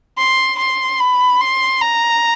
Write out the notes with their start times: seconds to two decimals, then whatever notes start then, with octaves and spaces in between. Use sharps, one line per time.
0.18 C6
0.59 C6
1.00 B5
1.41 C6
1.81 A#5